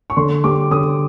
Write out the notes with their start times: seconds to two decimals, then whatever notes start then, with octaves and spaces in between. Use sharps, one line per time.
0.10 C#6
0.17 D3 C6
0.44 G3 D6
0.71 D3 D#6